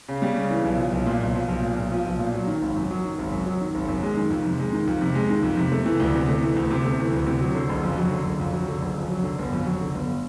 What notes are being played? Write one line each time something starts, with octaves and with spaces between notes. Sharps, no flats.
C#3
G3
C#3
E3
B1
F3
B1
A#2
B1
F3
B1
A#2
B1
F3
B1
A#2
F#3
D#3
G#1
F#2
F#3
D#3
G#1
F#2
F#3
D#3
G#1
F#2
G#3
D#3
F2
C3
G#3
D#3
F2
C3
G#3
D#3
F2
C3
A3
E3
D2
C3
A3
E3
D2
C3
A3
E3
D2
C3
F#3
D3
F#1
F2
F#3
D3
F#1
F2
F#3
D3
F#1
F2
F#3
D3
G1
F2
F#3
D3
G1